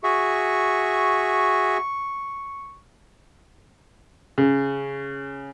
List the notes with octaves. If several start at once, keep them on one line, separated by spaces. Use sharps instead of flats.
F#4 G#4 E5 C#6
C#3